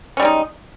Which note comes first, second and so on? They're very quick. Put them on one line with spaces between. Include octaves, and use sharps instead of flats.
C#4 G3 G#3 D#4